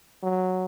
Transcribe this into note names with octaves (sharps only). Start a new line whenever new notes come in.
F#3